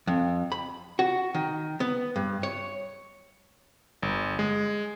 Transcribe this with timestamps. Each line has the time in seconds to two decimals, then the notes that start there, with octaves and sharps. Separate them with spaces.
0.07 F2
0.52 B5
0.99 F#4
1.35 D#3
1.80 B3
2.16 G2
2.43 C#5
4.02 G1
4.39 G#3